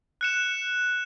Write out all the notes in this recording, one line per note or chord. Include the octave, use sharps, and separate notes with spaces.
F#6 C#7 E7